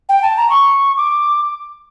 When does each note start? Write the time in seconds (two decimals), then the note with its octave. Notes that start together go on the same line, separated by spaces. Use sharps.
0.09 G5
0.22 A5
0.37 A#5
0.50 C#6
0.97 D6